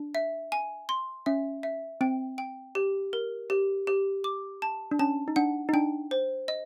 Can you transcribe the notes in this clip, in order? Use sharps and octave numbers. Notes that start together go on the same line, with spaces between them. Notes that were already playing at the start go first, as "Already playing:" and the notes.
Already playing: D4
E5
G#5
C6
C#4 E5
E5
C4 G5
G5
G4
A#4
G4
G4
D6
A5
D4
C#4 A5
D#4
D4 F#5
D#4
D4 G5
C5
D#5